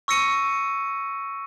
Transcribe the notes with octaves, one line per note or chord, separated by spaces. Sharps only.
C#6 E6 A#6 C#7 D#7